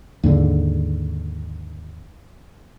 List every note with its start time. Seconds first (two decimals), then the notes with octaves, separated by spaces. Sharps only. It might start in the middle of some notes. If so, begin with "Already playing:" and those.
0.23 D#2 G#2 D3